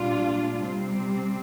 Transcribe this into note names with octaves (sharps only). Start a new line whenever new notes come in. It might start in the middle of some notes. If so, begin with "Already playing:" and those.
Already playing: A#2 G3 D4 F4
C3 G3 C4